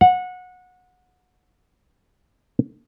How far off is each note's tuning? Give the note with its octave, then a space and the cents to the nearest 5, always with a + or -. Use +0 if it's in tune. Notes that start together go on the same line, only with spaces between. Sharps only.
F#5 -25